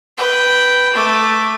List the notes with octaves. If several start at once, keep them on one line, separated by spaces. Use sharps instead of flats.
B4 G5
A3 D6